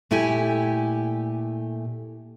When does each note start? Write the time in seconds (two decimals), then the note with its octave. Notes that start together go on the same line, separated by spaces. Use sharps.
0.11 A#2 A3 E4 G4 G#5